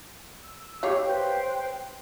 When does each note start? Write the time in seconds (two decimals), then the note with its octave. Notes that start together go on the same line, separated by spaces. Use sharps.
0.41 E6
0.83 G4 C#5 F5
1.04 B4 C5 G5